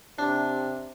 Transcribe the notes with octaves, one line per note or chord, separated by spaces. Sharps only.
C3 D4